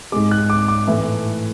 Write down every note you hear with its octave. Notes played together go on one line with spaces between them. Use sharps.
G#2 G#3 D6
F#6
D6
D6
A2 E3 A3